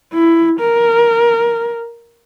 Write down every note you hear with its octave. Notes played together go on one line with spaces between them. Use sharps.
E4
A#4